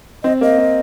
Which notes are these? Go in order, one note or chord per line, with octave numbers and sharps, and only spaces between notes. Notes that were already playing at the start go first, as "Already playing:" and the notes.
C4 D#5
A#3 D#5
A#3